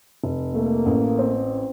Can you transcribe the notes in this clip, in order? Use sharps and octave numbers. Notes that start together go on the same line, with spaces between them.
F1
A3 A#3
A1
C4